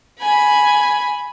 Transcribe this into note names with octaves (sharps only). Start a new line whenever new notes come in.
G#5 B5